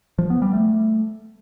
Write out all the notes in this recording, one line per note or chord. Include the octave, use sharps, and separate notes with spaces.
F3
B3
G3
A3